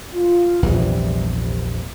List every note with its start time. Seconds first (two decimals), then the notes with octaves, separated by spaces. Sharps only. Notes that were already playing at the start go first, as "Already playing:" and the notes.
0.15 F4
0.62 A#1 E2 C3 E3 G3
1.33 C2